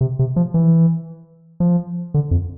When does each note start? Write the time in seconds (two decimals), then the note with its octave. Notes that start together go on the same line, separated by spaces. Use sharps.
0.01 C3
0.19 C3
0.36 F3
0.54 E3
1.60 F3
2.14 D3
2.31 F2